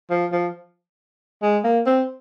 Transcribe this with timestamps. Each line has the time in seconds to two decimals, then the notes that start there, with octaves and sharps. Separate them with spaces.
0.10 F3
0.32 F3
1.42 G#3
1.64 A#3
1.86 C4